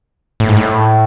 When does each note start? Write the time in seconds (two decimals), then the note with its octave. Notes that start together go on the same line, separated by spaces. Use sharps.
0.40 A2
0.49 G#2
0.57 A2